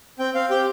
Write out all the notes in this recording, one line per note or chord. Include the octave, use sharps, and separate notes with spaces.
C4 G5
C4 F5
G4 G5